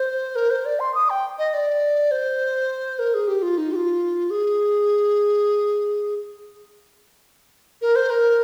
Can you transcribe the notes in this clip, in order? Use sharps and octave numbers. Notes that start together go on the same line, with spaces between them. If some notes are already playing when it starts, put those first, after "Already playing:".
Already playing: C5
A#4
C5
D5
C6
D#6
G5
D#5
D5
C5
A#4
G#4
G4
F4
D#4
G4
F4
G#4
A#4
C5
A#4